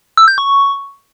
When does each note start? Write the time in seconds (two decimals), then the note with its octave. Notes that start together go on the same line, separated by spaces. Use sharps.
0.17 E6
0.28 G6
0.38 C#6